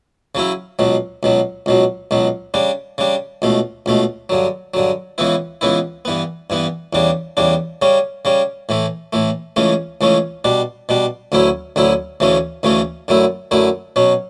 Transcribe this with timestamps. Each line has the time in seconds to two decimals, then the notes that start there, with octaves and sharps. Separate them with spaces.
0.35 C#3 F#3 C#4 E4
0.79 C#2 B2 F#3
1.23 C#2 B2 F#3
1.66 C#2 B2 F#3
2.11 C#2 B2 F#3
2.54 C#3 G3 D4
2.98 C#3 G3 D4
3.42 C#2 B2 A3
3.86 C#2 B2 A3
4.29 G2 D3 F#3
4.74 G2 D3 F#3
5.18 C#2 C#3 E3 B3 E4
5.61 C#2 C#3 E3 B3 E4
6.05 G2 E3 B3
6.50 G2 E3 B3
6.93 E2 C#3 G3 D4
7.37 E2 C#3 G3 D4
7.82 C#3 G3 C#4
8.25 C#3 G3 C#4
8.69 A2 E3 A3
9.13 A2 E3 A3
9.56 C#2 C#3 E3 A3 C#4
10.01 C#2 C#3 E3 A3 C#4
10.44 B2 G3 D4
10.89 B2 G3 D4
11.32 D2 D3 F#3 C#4 E4
11.76 D2 D3 F#3 C#4 E4
12.20 D2 C#3 E3 A3 C#4
12.63 D2 C#3 E3 A3 C#4
13.08 F#2 D3 F#3 A3 E4
13.51 F#2 D3 F#3 A3 E4
13.96 B2 F#3 C#4